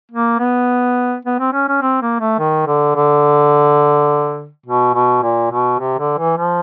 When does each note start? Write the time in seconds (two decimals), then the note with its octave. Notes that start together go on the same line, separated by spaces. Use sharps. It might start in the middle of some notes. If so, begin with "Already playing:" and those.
0.12 A#3
0.39 B3
1.26 B3
1.40 C4
1.53 C#4
1.68 C#4
1.82 C4
2.01 A#3
2.20 A3
2.39 D#3
2.67 D3
2.95 D3
4.66 B2
4.94 B2
5.23 A#2
5.51 B2
5.79 C3
5.99 D3
6.18 E3
6.37 F3